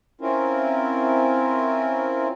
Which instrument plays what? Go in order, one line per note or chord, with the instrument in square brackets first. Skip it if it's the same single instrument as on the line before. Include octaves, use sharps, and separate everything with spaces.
[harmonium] C4 C#4 E4 F4 A#4